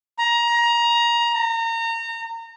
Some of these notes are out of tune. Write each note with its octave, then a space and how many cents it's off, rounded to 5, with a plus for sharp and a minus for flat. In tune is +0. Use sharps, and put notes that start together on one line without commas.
A#5 +20
A#5 -30